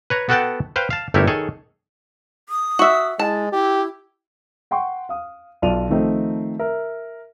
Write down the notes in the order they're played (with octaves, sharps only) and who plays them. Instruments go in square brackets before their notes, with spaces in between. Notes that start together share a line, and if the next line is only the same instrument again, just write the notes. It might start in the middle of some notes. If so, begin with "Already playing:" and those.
[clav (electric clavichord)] B4 C#5 A#5
B3 F#4 A4 F#5 G5 A5
B4 C5 F5 G5
F5 A5
G1 A3 E4 G4 A#4 C#5
D#3 G#4 A4 C#5
[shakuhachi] D#6
[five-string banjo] F#4 E5
[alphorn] G#3 [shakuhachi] E4 [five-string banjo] A5
[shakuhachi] E4 [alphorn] G4
[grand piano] F#5 G5 C6 C#6
F5 D#6
B1 F4 D5 D#7 F7
D#3 F3 A3 C4 D#4
A#4 E5